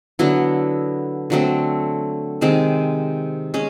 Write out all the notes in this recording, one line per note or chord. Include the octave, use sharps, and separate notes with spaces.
D3 F#3 B3 E4
D3 F#3 A3 C4
C3 D#3 G#3 C4
G#3 C#4